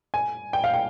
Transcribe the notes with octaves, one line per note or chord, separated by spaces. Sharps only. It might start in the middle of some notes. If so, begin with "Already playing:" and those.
G#5
G5
F5
G5